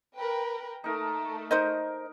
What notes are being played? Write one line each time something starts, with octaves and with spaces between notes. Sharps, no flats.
A#4 B4 G5
A3 D#4 A#4
D#4 A#4 C5 D#5